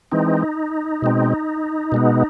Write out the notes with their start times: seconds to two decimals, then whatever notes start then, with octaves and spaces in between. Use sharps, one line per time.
0.12 E3 G#3 C4 D#4
1.02 B2 G#3 C4
1.92 B2 G#3 B3